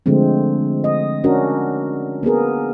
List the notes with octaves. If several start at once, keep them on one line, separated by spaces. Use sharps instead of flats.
D3 F3 G#3 A3 C4
D#5
C#4 D4 F#4 A#4
A#3 B3 G#4 A#4